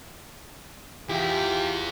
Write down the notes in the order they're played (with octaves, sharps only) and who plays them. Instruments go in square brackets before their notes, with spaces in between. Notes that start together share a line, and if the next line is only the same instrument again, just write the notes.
[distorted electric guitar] E2 E4 [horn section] F4 G4